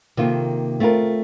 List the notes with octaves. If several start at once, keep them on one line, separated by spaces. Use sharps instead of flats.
C3 D#3 A#3 F4 A4
A3 C4 F4 A#4